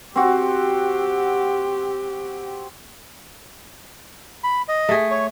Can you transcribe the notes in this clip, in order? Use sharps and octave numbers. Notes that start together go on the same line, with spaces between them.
C4 F#4 G4
B5
D#5
A3 G#4
C#5